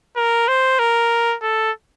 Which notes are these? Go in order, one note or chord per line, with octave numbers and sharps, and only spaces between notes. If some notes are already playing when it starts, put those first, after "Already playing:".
A#4
C5
A#4
A4